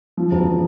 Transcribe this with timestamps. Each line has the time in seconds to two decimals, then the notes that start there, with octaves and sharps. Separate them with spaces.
0.17 F3
0.31 E1